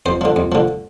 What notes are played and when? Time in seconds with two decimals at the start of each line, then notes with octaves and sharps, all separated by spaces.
0.06 F2 C5
0.21 D3 F3
0.36 F2
0.52 D3 F3